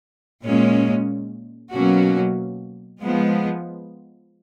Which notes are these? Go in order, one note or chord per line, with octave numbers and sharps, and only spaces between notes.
A#2 G#3 C#4
B2 F#3 A#3 C#4 F#4
F3 G#3 B3